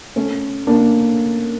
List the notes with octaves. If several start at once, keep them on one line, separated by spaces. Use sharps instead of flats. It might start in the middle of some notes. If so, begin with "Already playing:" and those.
A3 C#4
A#3 D4